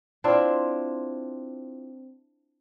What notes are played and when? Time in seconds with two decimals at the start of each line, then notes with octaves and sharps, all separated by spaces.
0.24 C4 D4 E4 F4